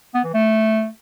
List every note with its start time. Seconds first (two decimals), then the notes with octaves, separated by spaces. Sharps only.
0.15 B3
0.24 E3
0.34 A3